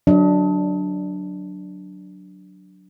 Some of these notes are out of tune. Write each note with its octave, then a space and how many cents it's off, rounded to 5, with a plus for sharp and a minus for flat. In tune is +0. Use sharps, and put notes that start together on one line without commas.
F#3 +0 D4 +0 D#5 +40